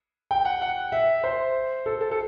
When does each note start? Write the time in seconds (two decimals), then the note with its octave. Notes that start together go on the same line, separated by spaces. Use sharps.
0.31 G5
0.45 F#5
0.62 F#5
0.92 E5
1.24 C5
1.86 A4
2.01 A4
2.11 A4